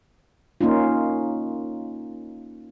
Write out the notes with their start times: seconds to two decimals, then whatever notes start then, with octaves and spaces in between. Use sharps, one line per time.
0.61 A#3 C#4 D#4 F4